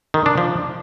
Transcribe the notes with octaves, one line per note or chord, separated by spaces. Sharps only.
D#3
D4
F3